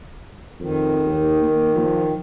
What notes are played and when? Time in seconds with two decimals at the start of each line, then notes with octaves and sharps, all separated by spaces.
0.60 F2 D#3
1.06 D#2
1.42 A#3
1.76 F3